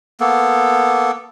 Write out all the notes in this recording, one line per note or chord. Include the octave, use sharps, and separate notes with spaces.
A#3 B3 A4